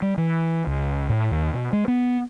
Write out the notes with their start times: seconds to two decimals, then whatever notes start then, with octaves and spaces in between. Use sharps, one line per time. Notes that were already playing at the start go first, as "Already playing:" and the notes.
0.02 G3
0.18 E3
0.67 C#2
1.09 A2
1.31 D#2
1.53 B2
1.73 G#3
1.88 B3